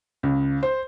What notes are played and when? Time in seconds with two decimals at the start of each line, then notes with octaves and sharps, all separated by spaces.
0.23 C#2
0.63 C5